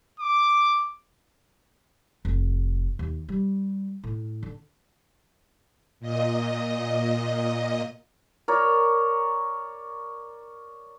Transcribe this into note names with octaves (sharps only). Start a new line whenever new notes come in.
D6
F1
D#2
G3
A2
D3
A#2 D#5
A#4 C#5 D5